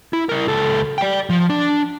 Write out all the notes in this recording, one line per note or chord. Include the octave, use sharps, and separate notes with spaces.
E4
E4 A#4
C#2 A4
D5 G5
F3
D4